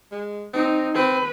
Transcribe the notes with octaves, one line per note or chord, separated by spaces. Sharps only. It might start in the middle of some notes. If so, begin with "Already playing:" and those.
G#3
C4 D#4
C4 B4